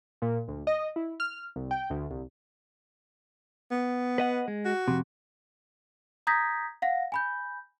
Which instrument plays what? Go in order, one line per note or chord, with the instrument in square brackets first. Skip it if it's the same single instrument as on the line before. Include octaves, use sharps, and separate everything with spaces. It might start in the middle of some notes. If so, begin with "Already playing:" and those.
[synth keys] A#2
D2
D#5
E4
F6
C2
G5
D2
C2
[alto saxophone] B3
[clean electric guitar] B4 D#5 F#5
G#3
[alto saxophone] F#4
[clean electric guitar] F2 C3
[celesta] A#5 D#6 G6 G#6 A#6 B6
F5 F#5 A#6
G#5 B5 G6